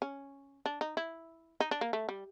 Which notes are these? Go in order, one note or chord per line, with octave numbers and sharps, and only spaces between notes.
C#4
D4
D#4
E4
D#4
D4
A#3
A3
G3